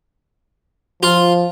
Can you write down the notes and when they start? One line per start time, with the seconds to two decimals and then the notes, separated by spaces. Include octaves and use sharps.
1.03 F3 F4